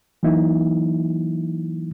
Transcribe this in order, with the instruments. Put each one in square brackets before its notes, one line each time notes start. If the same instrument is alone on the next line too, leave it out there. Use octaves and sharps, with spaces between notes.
[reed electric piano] E3 F#3 A#3 D#4 E4